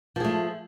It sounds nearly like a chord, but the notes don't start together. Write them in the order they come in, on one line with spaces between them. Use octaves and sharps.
F3 G#4 A3